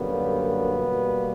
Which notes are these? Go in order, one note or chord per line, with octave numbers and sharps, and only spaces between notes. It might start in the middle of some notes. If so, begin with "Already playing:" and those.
Already playing: F#2 D3 G3 A#3 B3
B2 G3 A#3